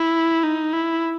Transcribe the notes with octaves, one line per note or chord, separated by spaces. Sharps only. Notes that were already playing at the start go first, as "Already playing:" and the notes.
Already playing: E4
D#4
E4